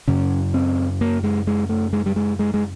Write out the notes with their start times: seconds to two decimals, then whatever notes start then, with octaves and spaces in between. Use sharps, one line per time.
0.08 F#2 C#3 C#4
0.54 C4
1.01 A#3
1.24 G#3
1.47 G#3
1.69 A3
1.93 G#3
2.06 G3
2.16 G#3
2.39 G#3
2.54 G#3